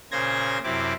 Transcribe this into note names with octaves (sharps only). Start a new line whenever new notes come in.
A#2 C#3 C5 G#6 A#6
F#2 C3 C4 E4 D6